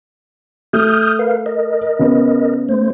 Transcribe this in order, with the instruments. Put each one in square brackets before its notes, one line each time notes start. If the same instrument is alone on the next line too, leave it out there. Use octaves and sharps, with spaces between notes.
[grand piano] A3 [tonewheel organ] D#6 F6 G6
[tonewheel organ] A#4 B4 F5
A#4 D#5
[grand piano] C#3 B3
[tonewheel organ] A3 C5